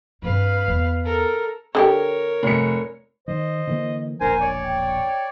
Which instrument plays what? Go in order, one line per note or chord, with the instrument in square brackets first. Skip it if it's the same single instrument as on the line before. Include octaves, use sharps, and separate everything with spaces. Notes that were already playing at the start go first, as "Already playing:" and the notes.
[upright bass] G2 C4 [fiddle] B4 F5
[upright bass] E2
[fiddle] A4 A#4
[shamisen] D3 C#4 G4 [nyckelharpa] A#4 C#5
[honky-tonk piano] F1 C#7
[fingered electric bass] D#3 [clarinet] C5 [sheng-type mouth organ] D#5
[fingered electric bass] D3 E3 A#3
[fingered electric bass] E1 A#1 D4 [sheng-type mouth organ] A#4 C5 [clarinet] G#5
[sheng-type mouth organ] C#5 D5
[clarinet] G5